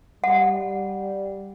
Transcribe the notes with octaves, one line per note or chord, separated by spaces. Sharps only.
G3 F#5